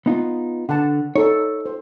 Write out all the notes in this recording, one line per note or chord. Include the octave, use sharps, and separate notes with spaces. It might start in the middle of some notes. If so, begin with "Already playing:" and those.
B3 D#4 F4
D3 F#5 A5
D#4 A4 C#5
C5